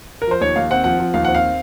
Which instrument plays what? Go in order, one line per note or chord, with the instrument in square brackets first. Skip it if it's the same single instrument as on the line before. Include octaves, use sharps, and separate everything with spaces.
[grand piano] A#4
F3 C5
D#2 C#5
D#2 F5
C4 F#5
F3 F#5
F3
D#2 F5
C4 F#5
F5